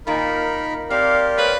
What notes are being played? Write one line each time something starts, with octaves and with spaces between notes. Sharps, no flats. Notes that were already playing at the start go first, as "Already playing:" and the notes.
A#2 D#3 A#3 D#4 A#4 B5
C4 G4 A#4 D5 F5
G#3 A#3 B4 C#5